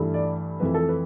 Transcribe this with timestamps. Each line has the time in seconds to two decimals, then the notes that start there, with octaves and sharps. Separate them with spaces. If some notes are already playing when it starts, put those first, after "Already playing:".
Already playing: G2 E3 A3
0.14 D5
0.60 F2 E3 A3 B4
0.74 A4
0.89 B4